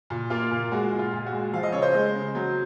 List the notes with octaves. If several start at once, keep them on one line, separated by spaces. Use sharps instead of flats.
A#2
A#3 F4
A#2
G#3 F#4
A#2
F4
A#2
F#4
G#3
F3 F5
D#5
C#3 C#5
C5 D#5
G#3
C#3
F#3